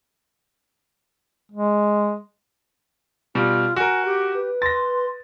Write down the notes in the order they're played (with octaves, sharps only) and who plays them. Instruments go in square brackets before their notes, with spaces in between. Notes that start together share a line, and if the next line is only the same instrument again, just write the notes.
[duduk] G#3
[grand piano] B2 G3 [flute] F4
[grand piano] F#4 A#4 [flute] G#5
[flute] G4
[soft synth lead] B4
[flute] C6 [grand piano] A6 A#6